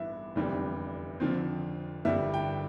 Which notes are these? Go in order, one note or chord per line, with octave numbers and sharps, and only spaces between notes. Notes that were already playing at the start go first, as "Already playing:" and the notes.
Already playing: A1 G2 E3 B3 E5
F1 E2 D3 G3 C4
F2 D3 F3 C4
G1 G2 E3 G3 E5
G5